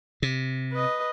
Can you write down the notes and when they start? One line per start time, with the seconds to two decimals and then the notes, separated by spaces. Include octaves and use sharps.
0.22 C3
0.73 B4 D#5